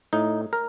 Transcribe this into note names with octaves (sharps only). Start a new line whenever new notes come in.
A2 D#4
A#4